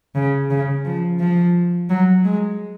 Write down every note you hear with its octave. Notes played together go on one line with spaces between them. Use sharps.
C#3
C#3
F3
F3
F#3
G#3